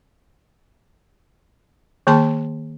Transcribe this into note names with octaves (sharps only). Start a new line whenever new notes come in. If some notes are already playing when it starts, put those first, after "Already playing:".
D#3 A#3 G#4 A5 C6